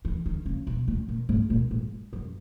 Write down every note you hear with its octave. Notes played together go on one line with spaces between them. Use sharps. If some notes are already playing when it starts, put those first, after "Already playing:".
E3
D#3
C#3
B2
A#2
A#2
G#2
A#2
G#2
F#2